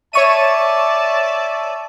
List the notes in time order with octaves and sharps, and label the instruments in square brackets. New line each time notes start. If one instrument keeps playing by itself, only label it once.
[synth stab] C#5 C#6 D#7 [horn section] D5 E5 A5